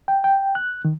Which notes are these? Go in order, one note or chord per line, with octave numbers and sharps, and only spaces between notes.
G5
G5
F#6
D#3